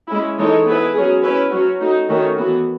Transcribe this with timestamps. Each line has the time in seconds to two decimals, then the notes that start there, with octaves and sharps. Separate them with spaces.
0.08 G#3 C#4 E4
0.37 E3 G#3 D#4 A4 C#5
0.66 B3 E4 G#4 B4
0.94 F#3 C#4 G#4
1.23 C#4 E4 B4
1.51 F#3 C#4 F#4
1.80 A3 D#4 F#4
2.08 D#3 A3 C#4 F#4
2.37 E3 B3 F#4